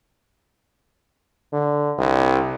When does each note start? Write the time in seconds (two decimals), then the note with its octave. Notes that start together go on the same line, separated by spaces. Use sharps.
1.53 D3
1.98 C2